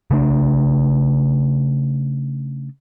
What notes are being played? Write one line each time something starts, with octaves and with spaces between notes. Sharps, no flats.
C#3 A3 D4